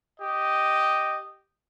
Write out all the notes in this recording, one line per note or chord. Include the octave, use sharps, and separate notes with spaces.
G4 D#5